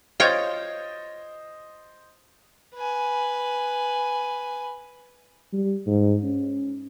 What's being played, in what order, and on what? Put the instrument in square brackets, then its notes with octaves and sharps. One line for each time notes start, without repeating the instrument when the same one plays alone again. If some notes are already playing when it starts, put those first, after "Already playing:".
[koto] F4 C#5 G5 [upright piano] C5 D#5 A6
[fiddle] B4 G#5
[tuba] G3
G#2
C#4